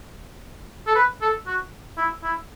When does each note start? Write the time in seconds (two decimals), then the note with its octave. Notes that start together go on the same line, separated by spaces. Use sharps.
0.87 A4
0.95 B4
1.21 A4
1.47 F#4
1.97 E4
2.23 E4